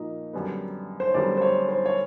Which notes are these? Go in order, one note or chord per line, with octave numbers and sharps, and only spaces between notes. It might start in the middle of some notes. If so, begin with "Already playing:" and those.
Already playing: A#2 F3 A#3 D#4
F#2 D3 G3 B3
C5
C#5
F#2 D3 G3 B3 D5
C5
C#5
C5
C#5